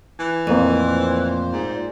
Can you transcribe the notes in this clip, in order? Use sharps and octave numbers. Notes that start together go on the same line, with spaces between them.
E3
F2 A#2 A3 A#3 C5
G#2